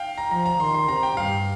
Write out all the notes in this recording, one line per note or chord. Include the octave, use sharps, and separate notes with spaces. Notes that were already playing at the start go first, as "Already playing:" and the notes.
Already playing: F5 G5
A#5
F3 A#5
A#5
D#3 C6
C6
C3 A#5
G5
G2 F5